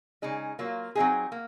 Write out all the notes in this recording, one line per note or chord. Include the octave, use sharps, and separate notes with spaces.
C#3 G#3 D#4
F#3 A#3 F4
F#3 C4 D#4 G#4
A#3